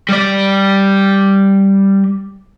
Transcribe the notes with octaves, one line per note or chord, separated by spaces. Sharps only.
G3 D5